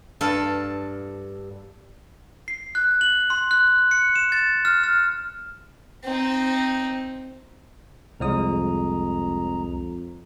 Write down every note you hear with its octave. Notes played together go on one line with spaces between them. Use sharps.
G2 A4 F5
C7
F#6
F#7
C6
F#6
C#7
E7
A6
F6
F6
C4 D#4
C2 F2 G#3 A#5 D#6